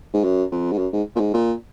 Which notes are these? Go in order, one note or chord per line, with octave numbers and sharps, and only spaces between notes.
G#2
F#2
F2
G#2
F#2
G#2
A#2
G#2
A#2